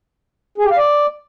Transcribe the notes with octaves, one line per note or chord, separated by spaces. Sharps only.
G#4
G4
F5
D5